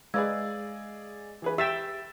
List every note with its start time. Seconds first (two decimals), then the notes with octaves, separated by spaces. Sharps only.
0.14 G#3 G#4 B4 D5 D#5 F5 E6 G#6
1.42 E3 G#4 B4
1.58 G4 E5 G5 E6 A6 E7